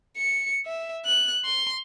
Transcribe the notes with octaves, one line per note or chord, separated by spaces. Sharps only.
C#7
E5
F#6
C6